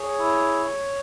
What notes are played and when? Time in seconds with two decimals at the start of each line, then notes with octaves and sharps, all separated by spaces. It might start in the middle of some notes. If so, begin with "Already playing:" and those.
Already playing: G#4 C#5
0.18 E4